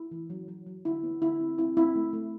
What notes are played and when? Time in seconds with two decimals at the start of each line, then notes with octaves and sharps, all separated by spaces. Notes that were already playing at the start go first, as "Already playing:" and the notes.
Already playing: E4
0.11 E3
0.30 F#3
0.48 F#3
0.66 F#3
0.85 D3 E4
1.04 B3
1.22 D3 E4
1.40 C4
1.58 C4 E4
1.77 C4 E4
1.96 A3
2.13 A3